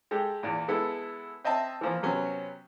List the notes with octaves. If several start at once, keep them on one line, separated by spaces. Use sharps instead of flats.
G#3 G4 A4
E2 A#2
G#3 B3 E4 A4
C4 D#5 E5 A5
E3 F3 A#3
C3 F#3 B3 C#4